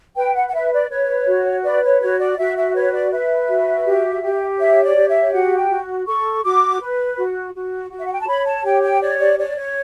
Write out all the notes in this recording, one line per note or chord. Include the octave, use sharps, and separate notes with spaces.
B4 G5
F#5
F#5
B4 E5
D5
B4 C#5
F#4
B4 D5
C#5
F#4 C#5
D5
F#4 E5
E5
B4 C#5
D5
B4 E5
F#4
G4
G4
C#5 E5
D5
G4
E5
F#4 F#5
G5
F#4
A4 C#6
F#4 D6
B4
F#4
F#4
F#4
E5
F#5
G5
A5
C#5 B5
A5
G4 G5
G5
C#5 D5
D5
C#5 D5
C#5